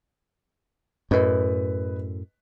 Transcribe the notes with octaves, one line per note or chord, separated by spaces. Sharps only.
F#2 A2 B4 D#5